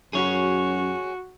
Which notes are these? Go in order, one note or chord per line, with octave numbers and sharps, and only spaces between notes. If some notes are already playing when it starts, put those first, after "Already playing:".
F#2 F#4 G#4 C#5